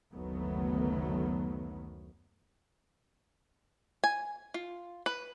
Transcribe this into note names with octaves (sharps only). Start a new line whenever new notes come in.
F#1 D2 D#3 F#3 A3 B3
G#5
F4
B4